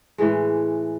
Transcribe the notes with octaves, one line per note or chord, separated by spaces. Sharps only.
A2 E3 G#3